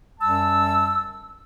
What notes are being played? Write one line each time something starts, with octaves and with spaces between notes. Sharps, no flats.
F#2 G3 A5 E6